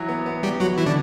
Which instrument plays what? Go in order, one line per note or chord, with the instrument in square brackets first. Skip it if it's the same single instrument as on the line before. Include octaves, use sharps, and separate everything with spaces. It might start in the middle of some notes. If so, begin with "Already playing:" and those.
Already playing: [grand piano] E3 F#3
B3
B3
[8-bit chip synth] G3 G4
F#3 F#4
E3 E4
D3 D4